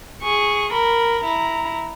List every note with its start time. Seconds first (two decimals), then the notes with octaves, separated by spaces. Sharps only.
0.23 G#4 C#6
0.73 A#4 B5
1.24 E4 A#5